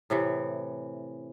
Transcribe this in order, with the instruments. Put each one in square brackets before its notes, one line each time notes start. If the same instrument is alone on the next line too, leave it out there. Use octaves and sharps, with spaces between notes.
[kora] A2 C3 E3